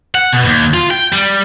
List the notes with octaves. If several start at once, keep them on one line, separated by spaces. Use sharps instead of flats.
F#5
B2
D#2
F4
G5
G3